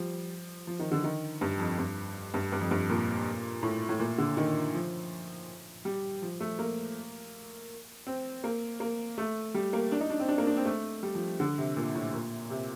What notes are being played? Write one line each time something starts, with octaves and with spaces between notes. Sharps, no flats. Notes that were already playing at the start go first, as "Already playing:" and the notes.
Already playing: F3 G3
F3
D#3
D3
D#3
G2
F2
G2
G2
G2
F2
G2
A#2
A2
A2
A#2
D3
D#3
F3
G3
F3
A3
A#3
C4
A#3
A#3
A3
G3
A#3
D4
D#4
D4
C4
D4
A#3
D4
C4
A3
G3
F3
D3
C3
A#2
A2
A#2
C3